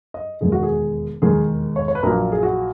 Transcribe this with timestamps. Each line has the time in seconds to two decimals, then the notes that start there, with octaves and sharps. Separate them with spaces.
0.14 D#5
0.41 E1 D#2 D#3 G#3 G#4
0.52 F#4
0.63 G#4
1.22 E1 D#2 D#3 G#3 G#4
1.76 C#5
1.88 C#5
1.95 B4
2.03 A#1 A#2 F#3 A#3 A#4
2.32 G#4
2.43 F#4